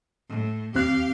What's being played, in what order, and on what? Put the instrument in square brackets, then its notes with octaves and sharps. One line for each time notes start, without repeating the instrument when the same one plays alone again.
[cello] A2
[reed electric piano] D#2 C4 F#6 [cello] G4 F5